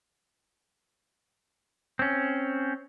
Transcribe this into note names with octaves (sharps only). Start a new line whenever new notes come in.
C4 C#4